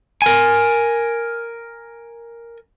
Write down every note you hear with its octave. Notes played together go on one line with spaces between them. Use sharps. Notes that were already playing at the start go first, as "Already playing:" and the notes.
A#4 G#5